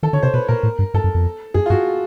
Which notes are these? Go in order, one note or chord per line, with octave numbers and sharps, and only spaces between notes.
D#3 A4
D3 C#5
C3 C5
B2 B4
A#2 A#4
A2
G2
G2 A4
F#2
F2
F#2 G#4
F4
G2 F#4